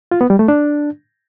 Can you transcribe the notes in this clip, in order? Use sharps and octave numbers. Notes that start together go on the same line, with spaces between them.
F4
B3
G3
A3
D4